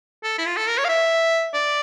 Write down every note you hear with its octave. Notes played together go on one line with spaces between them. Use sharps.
A4
E4
F4
A4
A#4
C#5
F5
E5
D5